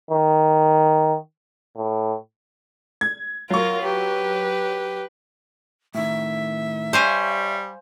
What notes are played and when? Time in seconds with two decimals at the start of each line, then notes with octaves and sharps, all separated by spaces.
0.11 D#3
1.76 A2
3.01 G#6
3.50 F#3 F4 A#4 C#6
3.83 G4 B4
5.95 A2 D#3 E5
6.93 G3 C5 C#5 F5 G#5